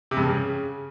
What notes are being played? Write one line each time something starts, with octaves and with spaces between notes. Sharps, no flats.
C3
G2
C#3